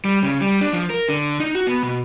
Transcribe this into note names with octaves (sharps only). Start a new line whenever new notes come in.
G3
C#3
G3
D4
F3
A#4
D3
D#4
F#4
B3
B2